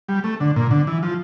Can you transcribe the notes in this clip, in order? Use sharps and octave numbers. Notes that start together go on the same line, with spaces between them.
G3
A3
D3
A#2
D3
E3
F3